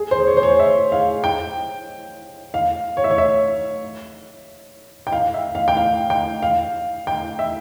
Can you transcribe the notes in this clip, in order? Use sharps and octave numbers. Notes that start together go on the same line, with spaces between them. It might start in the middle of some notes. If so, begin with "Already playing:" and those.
Already playing: G#4
C5
C#5
C5
C#5
E5
F5
G5
F5
C#5
E5
C#5
E5
G5
F5
E5
F5
G5
F5
G5
F5
G5
E5